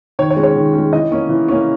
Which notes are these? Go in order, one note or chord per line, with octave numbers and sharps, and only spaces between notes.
D#3 C#5
C#5
G#3 C#4
C#5
D#3
G#3 C#4
E3 D#5
A#3 C#4
E3
A#3 C#4